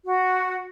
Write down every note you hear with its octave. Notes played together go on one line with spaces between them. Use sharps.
F#4